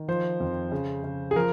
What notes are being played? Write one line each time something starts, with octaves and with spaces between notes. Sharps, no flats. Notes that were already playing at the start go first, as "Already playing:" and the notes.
Already playing: D#3
F3 C5
F2
C#3
C#3
G#4
F3 A#4